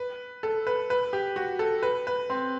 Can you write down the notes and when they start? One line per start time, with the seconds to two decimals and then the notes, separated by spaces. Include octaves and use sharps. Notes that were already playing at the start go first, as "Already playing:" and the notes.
Already playing: B4
0.43 A4
0.67 B4
0.90 B4
1.13 G4
1.36 F#4
1.59 A4
1.83 B4
2.07 B4
2.30 C4